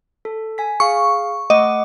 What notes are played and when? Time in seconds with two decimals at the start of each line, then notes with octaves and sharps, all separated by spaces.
0.25 A4
0.58 G#5 B6
0.80 G#4 F5 C#6
1.50 A3 D#5 F#5 D6